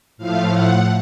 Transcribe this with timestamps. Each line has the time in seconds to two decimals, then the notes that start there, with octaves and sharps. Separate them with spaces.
0.17 A2 F3 A3 F5
0.49 F#5